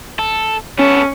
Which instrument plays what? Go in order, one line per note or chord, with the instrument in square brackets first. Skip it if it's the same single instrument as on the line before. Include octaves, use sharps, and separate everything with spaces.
[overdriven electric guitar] A4
[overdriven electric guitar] B3 A4 [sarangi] C#4